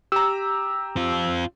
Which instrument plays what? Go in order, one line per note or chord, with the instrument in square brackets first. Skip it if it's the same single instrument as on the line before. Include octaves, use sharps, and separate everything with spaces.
[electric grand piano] G4 A#5 [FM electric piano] E6
[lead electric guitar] C4 F4